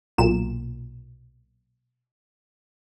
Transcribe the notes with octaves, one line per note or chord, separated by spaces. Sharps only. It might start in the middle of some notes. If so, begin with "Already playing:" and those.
B1 A#2 E7